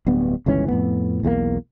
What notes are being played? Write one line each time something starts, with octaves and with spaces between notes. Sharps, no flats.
D1 G2 B3
G1 C#2 E3 C#4
F2 A2 B3
B1 E2 G#3 A#3